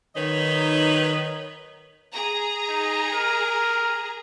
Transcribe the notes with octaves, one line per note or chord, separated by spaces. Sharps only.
D#3 F#3 D#4 B4 C#5 D#5
G#4 A#5
D#4
A#4